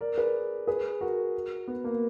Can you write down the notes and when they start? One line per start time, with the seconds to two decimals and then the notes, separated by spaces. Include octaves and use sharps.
0.01 A#4 D5
0.18 G#4 B4
0.67 G#4 B4
1.01 F#4 A#4
1.68 B3
1.84 A#3